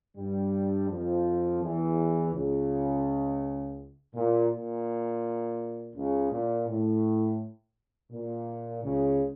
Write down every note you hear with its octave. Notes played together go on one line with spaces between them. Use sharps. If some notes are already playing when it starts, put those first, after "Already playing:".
G2 G3
F2 F3
E2 E3
C#2 C#3
A#2
A#2
C#2 C#3
A#2
A2
A#2
C#2 C#3